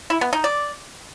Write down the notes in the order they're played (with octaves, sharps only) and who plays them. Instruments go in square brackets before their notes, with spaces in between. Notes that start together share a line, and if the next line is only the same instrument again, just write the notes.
[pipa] E4
B3
D#4
D5